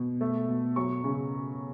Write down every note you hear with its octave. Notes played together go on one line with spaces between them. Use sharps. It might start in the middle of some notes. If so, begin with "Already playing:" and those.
Already playing: B2
A3
B2
F#3 C#6
C#3